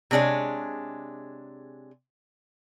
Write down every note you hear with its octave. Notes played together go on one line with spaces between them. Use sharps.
C3 G#3 D4 G#4 C#5